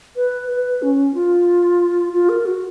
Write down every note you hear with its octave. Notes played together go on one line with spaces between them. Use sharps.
B4
B4
C#4
F4
F4
A#4
F#4